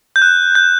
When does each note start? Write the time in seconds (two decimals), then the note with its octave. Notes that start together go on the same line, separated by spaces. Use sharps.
0.16 G6
0.22 F#6
0.55 G6